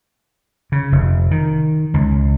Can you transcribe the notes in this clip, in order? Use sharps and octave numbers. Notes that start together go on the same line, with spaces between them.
C#3
F1
D#3
C#2